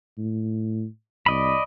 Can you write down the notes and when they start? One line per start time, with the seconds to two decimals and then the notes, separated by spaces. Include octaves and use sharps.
0.18 A2
1.26 C2 D5 D#5 B5